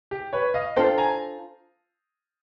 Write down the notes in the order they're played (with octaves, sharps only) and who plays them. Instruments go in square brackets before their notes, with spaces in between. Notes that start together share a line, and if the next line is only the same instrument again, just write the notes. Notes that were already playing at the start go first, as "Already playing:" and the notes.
[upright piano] G4
B4 C#5
D#5 F5
[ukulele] D4 F4 A4 C5 [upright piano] G5 A5
[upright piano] G#5 A#5